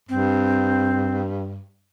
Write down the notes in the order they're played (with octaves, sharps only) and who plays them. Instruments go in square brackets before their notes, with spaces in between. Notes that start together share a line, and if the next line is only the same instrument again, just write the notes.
[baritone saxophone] G2 [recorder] C4